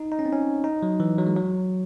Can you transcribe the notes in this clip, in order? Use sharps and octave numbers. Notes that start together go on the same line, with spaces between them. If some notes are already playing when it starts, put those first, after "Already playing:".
Already playing: D#4
D#4
C#4
C4
C#4
D#4
F#3
E3
F#3
G#3
F#3